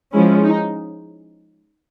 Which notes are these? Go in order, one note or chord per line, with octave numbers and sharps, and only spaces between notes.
F3 G#3 C#4 E4
D#4